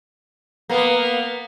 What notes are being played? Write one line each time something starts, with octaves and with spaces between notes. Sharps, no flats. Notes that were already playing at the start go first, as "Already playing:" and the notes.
A#3 B3